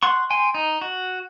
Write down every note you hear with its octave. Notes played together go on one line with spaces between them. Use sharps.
F#5 C6 C#6
G5 G#5 C6
D#4
F#4